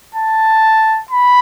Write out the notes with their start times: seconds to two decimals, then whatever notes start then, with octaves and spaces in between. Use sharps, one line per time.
0.15 A5
1.10 B5